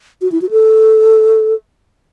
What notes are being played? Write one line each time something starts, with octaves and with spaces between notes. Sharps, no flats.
F#4
E4
F#4
A4